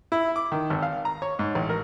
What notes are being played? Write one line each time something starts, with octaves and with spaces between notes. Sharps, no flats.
E4
D6
D#3
G#1
F5
A#5
C#5
G#2
A1
A#4